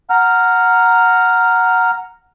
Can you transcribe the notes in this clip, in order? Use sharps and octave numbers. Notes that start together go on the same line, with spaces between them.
F#5 A#5 F6